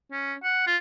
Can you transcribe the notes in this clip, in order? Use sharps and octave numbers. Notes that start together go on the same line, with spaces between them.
C#4
F#5
F4